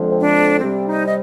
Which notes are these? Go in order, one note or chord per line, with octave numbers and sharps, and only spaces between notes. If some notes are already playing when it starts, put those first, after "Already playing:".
Already playing: F2 D3 F3 G#3
C4
D4
C3 G3 C4
D#4
D#5